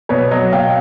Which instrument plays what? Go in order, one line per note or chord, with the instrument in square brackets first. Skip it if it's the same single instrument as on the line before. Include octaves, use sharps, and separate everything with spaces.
[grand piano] B2 [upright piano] B4 C#5
[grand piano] F#3 [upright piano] C#5 D#5
[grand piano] B2 [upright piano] F5 G5